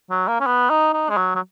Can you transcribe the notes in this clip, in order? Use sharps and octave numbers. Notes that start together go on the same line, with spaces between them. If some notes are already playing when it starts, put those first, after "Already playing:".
F#3
A#3
C#4
B3
D#4
D#4
G#3
F#3
F#3